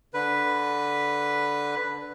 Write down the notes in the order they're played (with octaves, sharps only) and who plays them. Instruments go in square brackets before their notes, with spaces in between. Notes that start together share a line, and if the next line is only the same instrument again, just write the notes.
[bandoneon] D3 B4